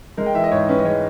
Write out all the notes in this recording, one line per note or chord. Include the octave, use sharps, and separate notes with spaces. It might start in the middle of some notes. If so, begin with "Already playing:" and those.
G#3 A#4
G5
E3 E5
D#5
G#2 C#5
C#4 B4
D#5
G#3 C#5